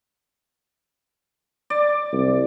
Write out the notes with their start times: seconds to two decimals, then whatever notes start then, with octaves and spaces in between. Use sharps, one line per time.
1.70 D5
2.13 C2